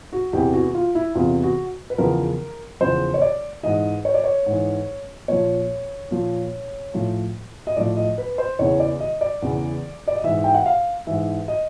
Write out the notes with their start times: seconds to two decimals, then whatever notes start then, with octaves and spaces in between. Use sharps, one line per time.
0.13 F#4
0.33 E2 C3 E3 G4
0.54 F#4
0.74 F4
0.95 E4
1.15 E2 C3 E3 F4
1.43 F#4
1.90 B4
1.98 E2 C#3 F3 A#4
2.81 E2 C#3 F3 C5
3.14 C#5
3.22 D5
3.63 G#2 E3 D#5
4.05 C#5
4.14 D5
4.24 C#5
4.46 G#2 E3
5.28 A#2 F3 C#5
6.11 A#2 F3
6.94 A2 F3
7.67 D#5
7.76 A2 F3 D5
7.97 D#5
8.18 B4
8.38 C5
8.59 E2 C#3 E3 C#5
8.80 D5
9.00 D#5
9.21 D5
9.42 E2 C#3 E3
10.08 D5
10.16 D#5
10.24 G#2 E3 E5
10.44 G5
10.55 F#5
10.66 F5
11.07 G#2 E3 E5
11.48 D#5